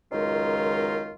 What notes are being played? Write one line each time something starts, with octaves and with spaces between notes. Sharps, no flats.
C#2 F#2 D#3 G#3 D#4 F4